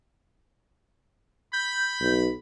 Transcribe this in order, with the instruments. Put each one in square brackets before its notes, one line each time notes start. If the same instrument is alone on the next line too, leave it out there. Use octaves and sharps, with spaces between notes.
[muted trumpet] B5 [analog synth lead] G6
[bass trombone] B1